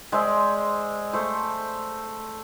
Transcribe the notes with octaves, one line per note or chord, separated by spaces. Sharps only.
G#3 C5 D5 E5
A3 C5